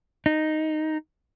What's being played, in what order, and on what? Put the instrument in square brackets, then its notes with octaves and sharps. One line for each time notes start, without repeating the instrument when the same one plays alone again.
[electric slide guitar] D#4